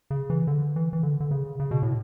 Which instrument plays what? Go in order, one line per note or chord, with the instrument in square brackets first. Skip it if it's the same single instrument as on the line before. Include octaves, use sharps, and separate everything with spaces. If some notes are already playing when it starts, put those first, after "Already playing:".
[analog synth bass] C#3
E3
D3
E3
E3
D3
D3
C#3
C#3
B2
A2